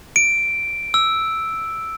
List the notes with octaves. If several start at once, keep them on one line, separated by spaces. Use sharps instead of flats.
D7
E6